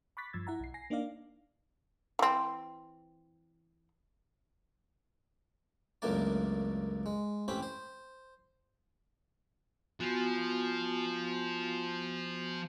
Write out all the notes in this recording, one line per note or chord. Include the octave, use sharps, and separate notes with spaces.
B5 C#6 D6 F#6 A6 B6
G2 F3 E6 G#6 A6
E4 F#5 A#5
B1 C7
G#5 A#6 C7
A#3 D4 D#4 D5 F5
E3 C4
C#2 F#2 A2 A#3 D4 D5
G#3
A1 C4 C#4 G4 B5
C5
F3 B3 F#4 G#5